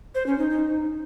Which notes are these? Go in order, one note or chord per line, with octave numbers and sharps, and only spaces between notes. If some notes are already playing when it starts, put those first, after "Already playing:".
C5
C#4
D#4
D#4